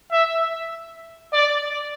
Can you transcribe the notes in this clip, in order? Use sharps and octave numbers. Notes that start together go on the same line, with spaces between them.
E5
D5